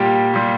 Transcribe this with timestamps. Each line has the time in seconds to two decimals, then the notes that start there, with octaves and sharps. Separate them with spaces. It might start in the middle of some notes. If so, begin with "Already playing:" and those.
Already playing: A#2 G3 G4 G5
0.34 A#2 G3